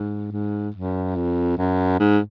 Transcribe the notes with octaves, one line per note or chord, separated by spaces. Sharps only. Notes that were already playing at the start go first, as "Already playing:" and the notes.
Already playing: G#2
G#2
F#2
F2
F#2
G#2